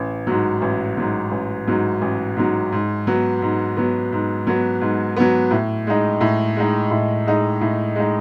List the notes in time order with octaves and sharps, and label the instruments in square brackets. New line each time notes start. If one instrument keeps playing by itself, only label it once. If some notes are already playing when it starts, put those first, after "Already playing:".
Already playing: [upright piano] A1
G#2 F#3
A1
G#2 F#3
A1
G#2 F#3
A1
G#2 F#3
G#2
F#3 B3
G#2
F#3 B3
G#2
F#3 B3
G#2
F#3 B3
A2
G#3 D#4
A2
G#3 D#4
A2
G#3 D#4
A2
G#3 D#4